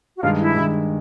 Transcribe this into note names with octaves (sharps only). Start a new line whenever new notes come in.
F#4
G2 D#3 G#3 F4
E4
G2 D#3 G#3